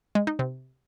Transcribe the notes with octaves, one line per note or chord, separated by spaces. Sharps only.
G#3
D#4
C3